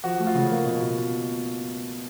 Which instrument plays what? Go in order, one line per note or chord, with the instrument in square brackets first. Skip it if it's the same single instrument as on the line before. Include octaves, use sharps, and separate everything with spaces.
[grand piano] F3 F#4
A3
F4
C#3
A#3
B2
B2